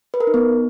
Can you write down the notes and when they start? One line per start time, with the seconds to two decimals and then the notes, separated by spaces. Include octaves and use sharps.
0.14 B4
0.20 A#4
0.27 D#4
0.34 B3